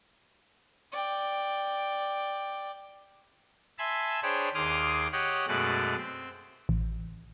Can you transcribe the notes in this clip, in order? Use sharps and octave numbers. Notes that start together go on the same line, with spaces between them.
D5 G5
E5 G#5 A5 B5 C6 E6
D4 G#4 C5 C#5 G5 B5
D#2 G#4 C6 D6 D#6 F6
G4 C#5 D#5 F#5
F#2 B2 G#3 A3 D5 F#6
C4
A1